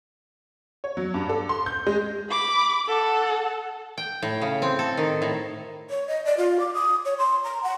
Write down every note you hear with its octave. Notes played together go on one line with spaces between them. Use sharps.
C#5
F#3
G2
A4
C6
G6
G#3
B5 D6
A4 F#5
G5
A2
C#3
C4
A4
D#3
A2
C#5
D#5
D5
F4
D6
D#6
C#5
C6
A#5
F#5